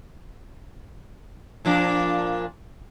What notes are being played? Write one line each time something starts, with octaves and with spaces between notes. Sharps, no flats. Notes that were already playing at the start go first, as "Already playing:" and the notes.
A#2 F3 D4